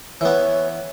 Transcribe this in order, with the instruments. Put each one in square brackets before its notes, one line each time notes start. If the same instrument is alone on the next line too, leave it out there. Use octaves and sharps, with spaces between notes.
[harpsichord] E3 B3 [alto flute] C#5